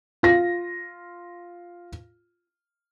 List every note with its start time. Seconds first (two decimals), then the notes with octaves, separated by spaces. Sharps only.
0.23 F4 A#6